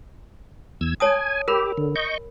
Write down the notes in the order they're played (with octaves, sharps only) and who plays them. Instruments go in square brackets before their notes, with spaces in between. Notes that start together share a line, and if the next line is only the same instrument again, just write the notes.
[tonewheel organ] E2 E6 G#6
[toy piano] C#5 A5 D#6 [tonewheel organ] G#5
[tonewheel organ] G4 [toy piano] A#4 B5
[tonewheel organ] D3
D#5 C#6 G6